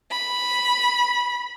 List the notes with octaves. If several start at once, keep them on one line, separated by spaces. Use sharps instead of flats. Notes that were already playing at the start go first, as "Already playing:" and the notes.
B5